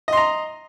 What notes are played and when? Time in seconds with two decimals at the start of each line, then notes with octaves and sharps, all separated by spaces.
0.08 D#5
0.13 C6
0.17 A#5